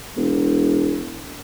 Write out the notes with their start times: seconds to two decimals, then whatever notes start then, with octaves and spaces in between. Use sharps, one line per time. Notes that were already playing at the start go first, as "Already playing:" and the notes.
0.17 E1